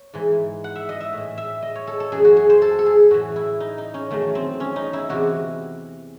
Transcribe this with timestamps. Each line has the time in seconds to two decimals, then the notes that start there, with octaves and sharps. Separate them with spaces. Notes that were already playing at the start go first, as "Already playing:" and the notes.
Already playing: C#5
0.14 G#2 E3
0.64 F#5
0.76 E5
0.89 D#5
1.00 E5
1.13 A2 E3
1.38 E5
1.62 D#5
1.75 C#5
1.87 A4
2.00 A4
2.12 F#2 E3 G#4
2.24 F#4
2.37 G#4
2.50 C5
2.62 A4
2.79 A4
2.86 G#4
3.11 A2 E3 F#4
3.36 E4
3.60 D#4
3.78 D#4
3.94 C#4
4.11 E2 D#3 F#3 A3
4.35 C4
4.60 C#4
4.76 D#4
4.93 E4
5.09 E2 C3 E3 F#4